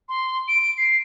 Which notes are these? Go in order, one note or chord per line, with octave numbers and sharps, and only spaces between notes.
C6
D7
C7